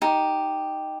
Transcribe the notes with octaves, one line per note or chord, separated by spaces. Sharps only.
D#4 G4